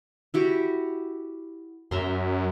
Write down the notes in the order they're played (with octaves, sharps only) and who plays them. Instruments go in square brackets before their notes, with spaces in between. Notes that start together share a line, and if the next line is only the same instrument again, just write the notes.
[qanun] E4 F#4 G4
[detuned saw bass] F#2 [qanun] E5 A#5 C6